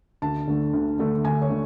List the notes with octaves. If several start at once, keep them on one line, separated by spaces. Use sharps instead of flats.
D2 A5
D3 A3 D4
D2
D3 A3 D4
D2 G#5
C#5
D3 A3